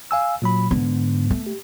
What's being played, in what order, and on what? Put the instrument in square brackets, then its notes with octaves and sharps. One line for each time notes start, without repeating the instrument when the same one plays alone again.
[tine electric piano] F5 G#5 E6
A#2 F#3 B5
[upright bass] G#2 D3 [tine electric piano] B3
[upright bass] A3
[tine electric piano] G4